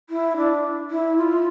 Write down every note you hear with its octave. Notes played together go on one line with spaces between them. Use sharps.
E4
D4
E4
F4